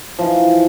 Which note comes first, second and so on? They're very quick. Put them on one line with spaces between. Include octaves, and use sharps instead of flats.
F3 E3 D#4